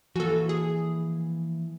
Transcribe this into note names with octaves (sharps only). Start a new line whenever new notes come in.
E3 F3 A#3 F#4 A4 G#5
G#4